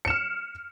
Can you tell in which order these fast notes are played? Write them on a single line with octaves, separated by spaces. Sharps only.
C#7 E7 F6